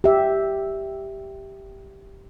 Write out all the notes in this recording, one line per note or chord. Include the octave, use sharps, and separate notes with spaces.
G4 E5